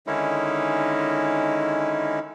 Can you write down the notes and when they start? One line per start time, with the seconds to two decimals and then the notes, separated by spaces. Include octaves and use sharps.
0.07 D3 D#3 G#3 C#4 D#4 E4